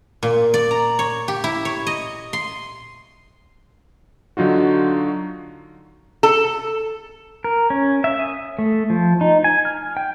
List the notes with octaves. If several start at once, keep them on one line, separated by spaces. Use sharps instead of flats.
A#2
D5
A#5
C#5
G4
E4
C#5
D#5
C6
D3 F#3 D#4 F4 F#4
A4
A#4
C#4
E5
D#6
A3
F3
D#4
G#5
F6
G5